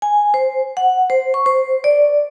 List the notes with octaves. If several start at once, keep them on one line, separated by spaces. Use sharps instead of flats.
G#5
C5
F#5
C5
C#6
C5
D5